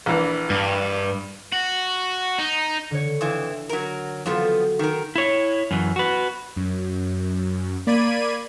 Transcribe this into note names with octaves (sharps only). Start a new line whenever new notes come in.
A#1 E3
G2
F#4
D#4
D3 C#5
F2 E3 E7
F#3 A#4
F2 F3 F#3 B3 A4
D#3 A#4
E4 C#5
F#2 E3
F#4 B4
F#2
A#3 D5 B5 G#6 D#7